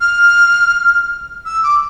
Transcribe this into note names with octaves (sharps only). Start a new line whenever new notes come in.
F6
E6
D6